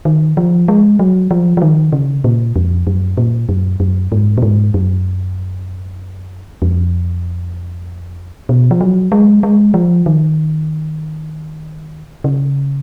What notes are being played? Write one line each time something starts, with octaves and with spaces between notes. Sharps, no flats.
D#3
F3
G#3
F#3
F3
F3
D#3
C#3
A#2
F2
F#2
A#2
F#2
F#2
G#2
A#2
G#2
F#2
F2
B2
F3
F#3
G#3
G#3
F3
D#3
C#3